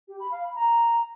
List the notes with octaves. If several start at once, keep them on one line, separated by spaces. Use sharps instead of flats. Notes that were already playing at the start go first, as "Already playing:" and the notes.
G4
B5
F5
B5
A#5